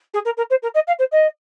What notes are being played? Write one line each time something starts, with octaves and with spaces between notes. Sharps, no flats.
G#4
A#4
A#4
C5
A#4
D#5
F5
C5
D#5